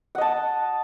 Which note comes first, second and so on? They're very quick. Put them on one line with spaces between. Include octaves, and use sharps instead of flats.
F#5 D#5 A5